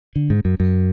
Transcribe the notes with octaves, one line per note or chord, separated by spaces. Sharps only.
D3
G#2
F#2
F#2